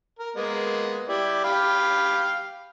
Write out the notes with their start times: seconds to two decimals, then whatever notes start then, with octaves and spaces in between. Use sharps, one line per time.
0.19 A#4
0.36 G#3 A#3 B3
1.08 E4 G4 D5
1.44 G4 F5 B5